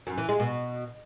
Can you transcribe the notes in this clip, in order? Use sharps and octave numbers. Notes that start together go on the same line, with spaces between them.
F#2
E3
G#3
B2